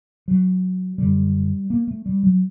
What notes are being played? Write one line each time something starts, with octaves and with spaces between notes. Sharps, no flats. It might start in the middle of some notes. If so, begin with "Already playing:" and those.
F#3
F#2 D3 G3
A#3
A3
G3
F#3